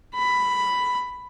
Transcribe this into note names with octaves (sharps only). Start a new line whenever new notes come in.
B5